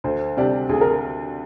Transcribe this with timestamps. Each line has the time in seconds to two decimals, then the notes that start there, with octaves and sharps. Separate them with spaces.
0.04 D2 C5
0.37 C3 G3 D4 G4
0.69 D2 G#4
0.81 A#4